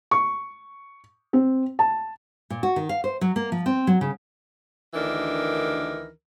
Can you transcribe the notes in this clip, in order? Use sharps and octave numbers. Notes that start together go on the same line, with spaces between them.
C#6
C4
A5
A#2
F#4
D#3
F5
C5
F#3
A#3
F3
C4
F#3
C#3
D2 D#3 E3 D4 A#4